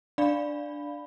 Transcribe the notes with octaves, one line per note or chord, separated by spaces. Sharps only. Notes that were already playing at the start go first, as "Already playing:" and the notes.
D4 D5 F5 B5